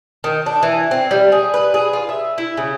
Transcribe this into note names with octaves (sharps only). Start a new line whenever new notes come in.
D#3
D4
E3
C4
G3
G#4
B4
G#4
F4
E5
E4
C#3